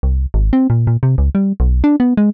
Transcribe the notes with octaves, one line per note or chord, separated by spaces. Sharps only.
C2
G#1
C4
A#2
A#2
C3
C#2
G3
B1
D4
B3
G#3